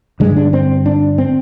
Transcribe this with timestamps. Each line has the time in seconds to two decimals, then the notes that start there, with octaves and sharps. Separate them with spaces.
0.20 G2 D3 G#3
0.37 D4
0.53 C4
0.86 D4
1.18 C4